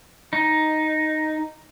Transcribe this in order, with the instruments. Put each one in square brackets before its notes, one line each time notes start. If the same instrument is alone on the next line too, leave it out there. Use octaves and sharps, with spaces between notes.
[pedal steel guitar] D#4